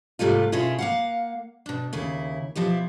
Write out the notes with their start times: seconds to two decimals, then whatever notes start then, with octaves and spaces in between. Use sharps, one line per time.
0.19 G#2 C3 G3 A3 F4
0.52 B2 C#4 E4 F4 G#4
0.78 A#3 F5 F#5
1.66 B2 D4
1.93 D#2 C#3 E4
2.55 B2 F3 E4 G4